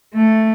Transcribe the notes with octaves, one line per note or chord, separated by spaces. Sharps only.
A3